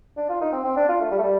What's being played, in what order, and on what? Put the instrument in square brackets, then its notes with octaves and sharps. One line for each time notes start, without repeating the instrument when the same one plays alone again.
[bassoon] D4
F4
D#4
C4
C4
D4
F4
A3
G3
A3
G3